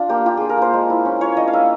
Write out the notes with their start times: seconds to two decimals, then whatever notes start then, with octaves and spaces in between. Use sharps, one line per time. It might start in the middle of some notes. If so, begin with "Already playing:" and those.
Already playing: D4 F4
0.09 A#3 G4
0.26 F4 G4
0.37 D4 G#4
0.49 A#4
0.57 A#3 C5
0.74 G#3
0.90 E4
1.05 C#4
1.21 F4 C#5
1.37 D4 D#5
1.48 F5
1.53 A#3 E5